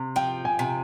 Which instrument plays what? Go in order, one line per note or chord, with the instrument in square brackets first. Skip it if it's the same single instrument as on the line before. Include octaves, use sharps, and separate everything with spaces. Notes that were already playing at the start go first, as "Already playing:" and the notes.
Already playing: [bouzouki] C3
[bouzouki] F3 [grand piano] G5
[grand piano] G#5
[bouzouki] C3